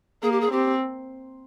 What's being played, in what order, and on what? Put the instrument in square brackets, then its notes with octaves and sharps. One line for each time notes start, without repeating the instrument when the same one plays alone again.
[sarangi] A#3 [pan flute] G#4
[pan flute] G4
G#4
[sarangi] C4 [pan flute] G4